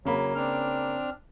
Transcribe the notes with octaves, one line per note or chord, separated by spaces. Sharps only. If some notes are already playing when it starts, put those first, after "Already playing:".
C#3 F#3 A#3 B5
C4 D4 F6